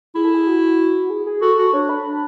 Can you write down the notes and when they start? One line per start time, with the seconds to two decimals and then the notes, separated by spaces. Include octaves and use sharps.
0.15 E4 G#4
0.24 A4
0.34 G#4
0.47 F#4
1.10 G#4
1.26 G#4
1.42 F#4 A4
1.58 F#4
1.73 D4 C#5
1.89 B5
2.05 D4